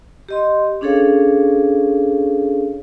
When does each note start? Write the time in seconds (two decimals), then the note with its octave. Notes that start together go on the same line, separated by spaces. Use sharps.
0.29 G4 D#5 C6
0.81 C#4 D4 G#4 A4 C#5 F5